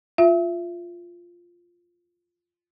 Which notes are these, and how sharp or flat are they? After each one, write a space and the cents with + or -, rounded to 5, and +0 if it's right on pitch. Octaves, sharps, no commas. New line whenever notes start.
F4 +0 E5 +20